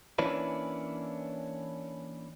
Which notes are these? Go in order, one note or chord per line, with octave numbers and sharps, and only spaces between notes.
E3 A#3 C#4 D4 E4 B4